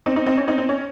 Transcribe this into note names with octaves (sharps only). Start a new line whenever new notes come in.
C4 D#4
C4 D#4
C4 D#4
C#4
C4 D#4
C4
C#4